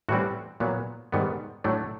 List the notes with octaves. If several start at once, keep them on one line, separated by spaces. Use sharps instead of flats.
A2 E3 G3 C4 F#4
A#2 F#3 B3
G#2 D#3 G3 B3
A2 F#3 A3 D4